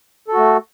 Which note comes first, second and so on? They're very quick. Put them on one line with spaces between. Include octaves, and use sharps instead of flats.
A4 F#4 A3